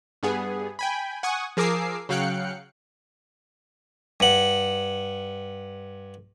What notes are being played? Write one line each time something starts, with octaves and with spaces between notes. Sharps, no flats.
G2 B3 G#4
G5 G#5 B5
F#5 G#5 C#6 D#6
F3 G#4 A#4 D6 E6 C7
C#3 F#3 F5 G5 F#6 C#7
G2 F#5